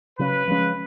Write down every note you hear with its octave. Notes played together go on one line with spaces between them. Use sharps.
C#3 F#3 C#4 B4
F3 G#3 C#4